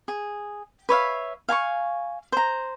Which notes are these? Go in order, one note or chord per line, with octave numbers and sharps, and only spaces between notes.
G#4
B4 C#5 E5 F5
F5 G#5 A#5 C#6
C5 A#5